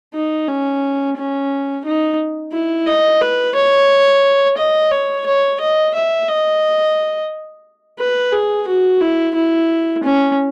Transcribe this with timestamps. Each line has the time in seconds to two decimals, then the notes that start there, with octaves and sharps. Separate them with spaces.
0.14 D#4
0.48 C#4
1.17 C#4
1.85 D#4
2.53 E4
2.87 D#5
3.21 B4
3.55 C#5
4.57 D#5
4.91 C#5
5.26 C#5
5.60 D#5
5.94 E5
6.28 D#5
7.99 B4
8.33 G#4
8.67 F#4
9.00 E4
9.35 E4
10.03 C#4